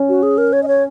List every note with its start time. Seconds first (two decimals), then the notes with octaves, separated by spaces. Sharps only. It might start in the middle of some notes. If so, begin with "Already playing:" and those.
Already playing: C#4
0.09 F#4
0.23 G#4
0.38 A#4
0.53 C#5
0.63 D#5
0.68 C#5